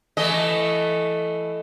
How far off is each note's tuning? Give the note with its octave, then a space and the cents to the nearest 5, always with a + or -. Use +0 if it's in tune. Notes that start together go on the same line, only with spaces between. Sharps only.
E3 +20 A3 +0 D#5 +0